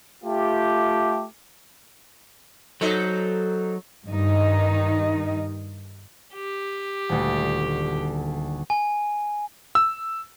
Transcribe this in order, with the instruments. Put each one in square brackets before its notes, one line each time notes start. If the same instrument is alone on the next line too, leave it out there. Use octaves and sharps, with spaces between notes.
[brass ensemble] A3 F4 G4
[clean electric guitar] F#3 [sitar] D#4 A4 C5
[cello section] G2 D#3 D#4
[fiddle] G4
[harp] D#1 D2
[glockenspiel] G#5
[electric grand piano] E6